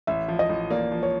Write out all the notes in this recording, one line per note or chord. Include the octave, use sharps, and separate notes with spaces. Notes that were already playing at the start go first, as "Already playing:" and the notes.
A1 E5
F3
D#5
A1
A#3 D5
F3
C#5